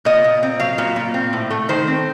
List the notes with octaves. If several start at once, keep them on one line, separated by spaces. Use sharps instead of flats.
A#2 D#5
A#2
C4
F#3 F5
A#2
A#2
C4
A2
A3
D#3 C5
C4